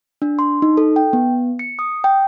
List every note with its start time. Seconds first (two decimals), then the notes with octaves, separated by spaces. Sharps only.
0.22 D4
0.39 C6
0.62 D#4
0.77 A4
0.96 G5
1.13 B3
1.59 C#7
1.79 D#6
2.04 G5